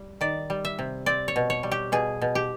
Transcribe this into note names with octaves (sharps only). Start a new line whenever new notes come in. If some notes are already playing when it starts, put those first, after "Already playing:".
Already playing: G3
D#3 D5
G3
E5
C3
C4 D5
C#5
B2
C#5
G3
G4
B2 G#4
B2
G4